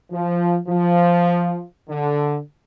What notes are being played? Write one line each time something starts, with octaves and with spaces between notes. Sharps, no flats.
F3
F3
D3